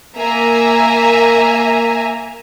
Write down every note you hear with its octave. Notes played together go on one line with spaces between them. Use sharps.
A#3 E5 G#5 A#5